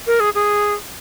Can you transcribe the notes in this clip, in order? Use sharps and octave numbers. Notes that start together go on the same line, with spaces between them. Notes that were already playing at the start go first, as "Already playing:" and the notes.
A#4
G#4
G#4